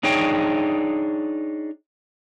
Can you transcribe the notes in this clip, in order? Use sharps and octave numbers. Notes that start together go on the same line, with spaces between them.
D4 D#4 G#4 C#5 G5